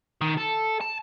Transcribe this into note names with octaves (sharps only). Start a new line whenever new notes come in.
D#3
A4
A5